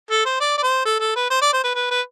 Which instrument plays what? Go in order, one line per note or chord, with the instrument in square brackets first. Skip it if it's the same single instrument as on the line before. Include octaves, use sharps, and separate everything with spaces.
[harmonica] A4
C5
D5
D5
C5
A4
A4
B4
C5
D5
C5
B4
B4
B4